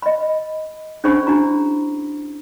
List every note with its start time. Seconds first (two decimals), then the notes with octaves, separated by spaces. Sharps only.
0.02 D#5 B5
1.04 C#4 D4 G#4 C5 B5 C#6
1.26 D4 E4 F#4 A#5 B5